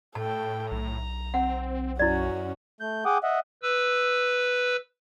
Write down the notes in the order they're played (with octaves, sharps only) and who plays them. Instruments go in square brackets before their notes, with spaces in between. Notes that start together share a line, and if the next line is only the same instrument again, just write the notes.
[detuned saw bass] A2 [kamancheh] A4 G5 [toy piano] A5
[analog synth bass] B1 [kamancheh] A#5
[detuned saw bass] C4 [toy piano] F#5
[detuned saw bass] F#2 [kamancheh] C#4 F#4 [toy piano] E4 D5
[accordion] A3 G6
G#4 F#5 G5 D6 D#6
D#5 E5 F#5
[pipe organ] B4 E6